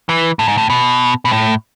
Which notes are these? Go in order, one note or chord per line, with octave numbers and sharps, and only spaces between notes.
E3
A2
G#2
A2
B2
B2
A2